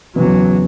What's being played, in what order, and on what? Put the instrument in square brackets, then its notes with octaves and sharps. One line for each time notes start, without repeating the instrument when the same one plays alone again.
[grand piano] E2 C#3 E3 [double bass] F#3